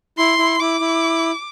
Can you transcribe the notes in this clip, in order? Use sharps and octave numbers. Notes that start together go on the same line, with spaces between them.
E4 C6
E4
E4 D6
E4